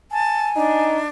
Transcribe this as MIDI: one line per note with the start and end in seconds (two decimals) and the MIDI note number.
0.11 0.86 80
0.11 0.46 81
0.56 1.08 62
0.56 1.01 63